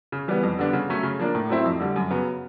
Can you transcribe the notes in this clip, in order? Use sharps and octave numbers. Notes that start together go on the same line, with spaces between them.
C#3
E3 G3 B3
F2
D3 G3 B3 D4
C#3
F#3 A3 C#4
C#3
F3 A#3 D4
A2
F#3 A3 C4 E4
F2
D3 G3
F#2
C#3 F#3 B3